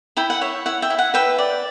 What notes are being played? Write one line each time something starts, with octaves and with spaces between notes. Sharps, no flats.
E4 G5 B5
F#5
C#5 E5
E4 F#5
E5 G5
E4
F#5
B4 E5 G5
D5